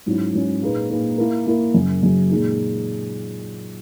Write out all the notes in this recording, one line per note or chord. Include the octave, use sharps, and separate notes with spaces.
G#2 F#3 C#4 E4
G#2 F#3 C#4 E4
A#2 A#3 D#4 G#4 B4
A#2 A#3 D#4 G#4 B4
A#3 E4 A#4
A#3 E4 A#4
F#2 C#3 F#3
F#2 C#3 F#3
A#2 G#3 D#4 G#4